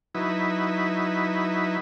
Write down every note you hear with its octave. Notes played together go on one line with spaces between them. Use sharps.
F#3 D#4 E4 B4